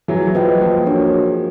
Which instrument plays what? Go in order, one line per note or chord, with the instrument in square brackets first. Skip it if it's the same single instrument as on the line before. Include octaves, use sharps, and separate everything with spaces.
[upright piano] E3 F#3 [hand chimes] G#4
[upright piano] F3 [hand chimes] B4 D#5 G5
[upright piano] F3 [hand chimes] A#3
[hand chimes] D4 F#4 A#4 C#5
G#4